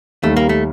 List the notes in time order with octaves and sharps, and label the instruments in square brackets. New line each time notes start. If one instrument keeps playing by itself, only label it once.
[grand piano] D#2 D#3 G3 [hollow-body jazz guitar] A3
[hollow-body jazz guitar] A#3
A3